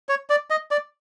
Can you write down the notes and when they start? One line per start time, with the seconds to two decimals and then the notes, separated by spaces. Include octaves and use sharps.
0.09 C#5
0.30 D5
0.50 D#5
0.71 D5